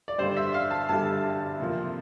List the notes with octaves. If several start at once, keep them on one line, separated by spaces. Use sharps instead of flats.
D5
G2 D3 G3 C5
E5
F5
A5
G2 D3 G3 A5
F2 C3 F3 A#3